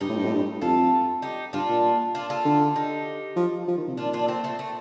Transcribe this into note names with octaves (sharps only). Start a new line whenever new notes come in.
G2 D#4 G4
A2
G2
A2
G2
F2 F4 A4
D#4 G4
G2 D4 F4
A#2
D4 F4
F4 A4
D3
D#4 G4
F3
F3
D#3
C3
A#2 D4 F4
D4 F4
A3 C4
A3 C4
A3